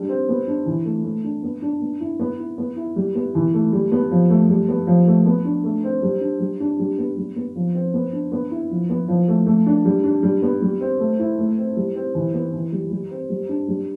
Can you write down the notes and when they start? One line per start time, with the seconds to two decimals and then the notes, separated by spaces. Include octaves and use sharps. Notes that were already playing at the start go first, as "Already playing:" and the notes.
Already playing: G3 D4
0.09 C4
0.29 B3
0.47 D4
0.66 E3
0.85 A3
1.04 A3
1.24 D4
1.43 B3
1.62 D4
1.82 B3
2.00 E4
2.20 B3
2.38 E4
2.58 B3
2.76 E4
2.96 G3
3.15 B3
3.35 E3
3.54 A3
3.73 G3
3.92 B3
4.11 F3
4.30 A3
4.49 G3
4.68 B3
4.87 F3
5.07 A3
5.26 B3
5.45 D4
5.64 A3
5.84 C4
6.02 G3
6.21 D4
6.40 G3
6.60 D4
6.79 G3
6.98 B3
7.17 G3
7.36 B3
7.56 F3
7.75 C4
7.94 B3
8.13 D4
8.32 B3
8.51 E4
8.71 F3
8.89 B3
9.08 F3
9.28 A3
9.46 A3
9.66 D4
9.85 G3
10.04 D4
10.23 G3
10.42 B3
10.62 G3
10.81 C4
10.99 A3
11.19 E4
11.39 A3
11.58 C4
11.77 G3
11.95 C4
12.15 E3
12.34 B3
12.53 E3
12.72 G3
12.91 G3
13.11 C4
13.30 G3
13.49 D4
13.68 G3